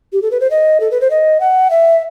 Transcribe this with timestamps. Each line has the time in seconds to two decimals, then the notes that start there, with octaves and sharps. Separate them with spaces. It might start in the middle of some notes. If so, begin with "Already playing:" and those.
0.13 G4
0.22 A4
0.31 B4
0.40 C5
0.50 D#5
0.80 A4
0.91 B4
1.01 C5
1.10 D#5
1.40 F#5
1.70 E5